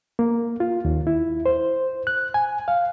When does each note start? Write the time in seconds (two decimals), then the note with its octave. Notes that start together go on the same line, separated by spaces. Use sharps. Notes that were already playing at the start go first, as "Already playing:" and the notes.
0.19 A#3
0.60 F4
0.85 D#2
1.07 E4
1.46 C5
2.07 F#6
2.34 G#5
2.68 F5